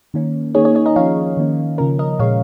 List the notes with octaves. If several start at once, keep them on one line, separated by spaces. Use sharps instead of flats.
D#3 A#3 C#4
D#3 A#3 D#4 G#4 C#5
G#4 C#5
G#4 C#5
A#4 D#5
F3 C#4 C#5 F5
D#3 A#3 C#4
C#3 F3 C#4 A#4
A#4 D#5
A#2 G#3 C#4 C#5 F5